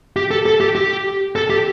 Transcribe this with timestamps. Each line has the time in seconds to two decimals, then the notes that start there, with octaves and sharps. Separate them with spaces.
0.17 G4
0.31 A4
0.46 A4
0.61 G4
0.76 G4
1.36 A4
1.50 G4